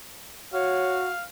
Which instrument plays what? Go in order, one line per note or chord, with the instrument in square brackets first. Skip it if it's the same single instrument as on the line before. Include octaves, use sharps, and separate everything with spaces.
[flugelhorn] F#4 [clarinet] C#5 [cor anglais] F5